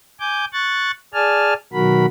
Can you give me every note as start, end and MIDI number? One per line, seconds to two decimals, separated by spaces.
0.20 0.45 80
0.20 0.45 86
0.20 0.45 91
0.53 0.91 85
0.53 0.91 90
0.53 0.91 93
1.14 1.54 68
1.14 1.54 74
1.14 1.54 80
1.14 1.54 81
1.14 1.54 89
1.73 2.06 47
1.73 2.06 51
1.73 2.06 54
1.73 2.06 66
1.73 2.06 70
1.73 2.06 83